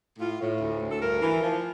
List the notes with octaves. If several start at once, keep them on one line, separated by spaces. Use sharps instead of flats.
A2 F4
A2
D2
D2
A4
G2 A#4
E3
F3